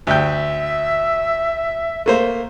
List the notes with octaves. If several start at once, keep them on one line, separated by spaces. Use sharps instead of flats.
D2 E5 G5
A3 A#3 C5